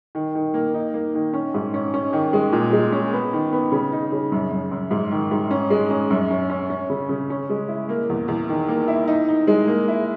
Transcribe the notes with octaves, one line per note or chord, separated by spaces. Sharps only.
D#3
D#3
A#3
D#4
A#3
D#3
C#4
G#2
C#4
C#4
D#3
G#3
A#2
G#3
C#4
B3
D#3
B3
C#3
D#4
C#3
F#2
F#2
F#2
G#2
D#3
G#2
C#4
G#3
C#4
F#2
C#4
C#4
C#4
C#3
C#3
C#4
G#3
E4
A#3
E2
E2
D#3
A#3
E4
D#4
D#4
G#3
A#3
E4